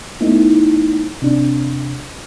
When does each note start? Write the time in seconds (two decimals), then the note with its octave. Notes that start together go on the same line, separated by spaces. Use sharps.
0.21 A3 B3 D#4 E4
1.22 C3 D4